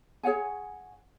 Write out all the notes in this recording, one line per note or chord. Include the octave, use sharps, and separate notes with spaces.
G#4 C#5 F#5 G#5